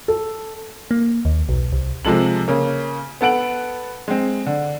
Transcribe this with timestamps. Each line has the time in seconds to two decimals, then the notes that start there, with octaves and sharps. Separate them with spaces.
0.08 A4
0.91 A#3
1.25 D#2
1.49 B1
1.72 C2
2.05 C3 F3 G#3 A4 F#7
2.48 C#3 A#3
3.21 B3 A4 F#5 D7 F#7
4.08 G#3 C4
4.46 D3